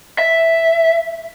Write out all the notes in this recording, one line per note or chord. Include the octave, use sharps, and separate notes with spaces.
E5